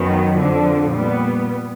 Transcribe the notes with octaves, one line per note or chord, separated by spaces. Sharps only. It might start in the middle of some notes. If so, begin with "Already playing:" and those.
Already playing: F#2 D#3 F#3 B3
F2 D3 F3
A#2 G3 B3